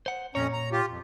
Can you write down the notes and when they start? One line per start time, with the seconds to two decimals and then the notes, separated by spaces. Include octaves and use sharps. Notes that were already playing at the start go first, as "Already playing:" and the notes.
0.06 C5 F#5
0.35 F2 A#2 C#4 C#5 A#5
0.53 A#5
0.72 F4 G4
0.89 F2